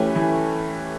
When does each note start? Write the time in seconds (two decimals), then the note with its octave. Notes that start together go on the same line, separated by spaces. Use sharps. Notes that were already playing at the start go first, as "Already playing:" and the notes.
Already playing: E3 A3 C#4 G4 B4
0.15 E3